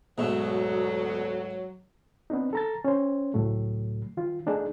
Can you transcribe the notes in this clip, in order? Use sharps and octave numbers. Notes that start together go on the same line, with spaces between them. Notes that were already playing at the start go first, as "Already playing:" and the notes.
D2 G#2 B2 F#3 A3
B3 C4 D4 D#4
A4 A#5 A6
C#4 C5
C#2 A2 F#3 A3
D#3 F4
A3 D4 D#4 G#4